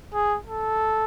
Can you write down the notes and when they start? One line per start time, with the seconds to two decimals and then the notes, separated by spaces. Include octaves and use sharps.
0.14 G#4
0.47 A4